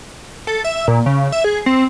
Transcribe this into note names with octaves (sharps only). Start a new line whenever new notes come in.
A4
E5
A#2
C#3
E5
G#4
C4